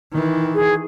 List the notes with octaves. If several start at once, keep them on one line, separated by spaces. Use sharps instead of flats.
D#3 E3
G#4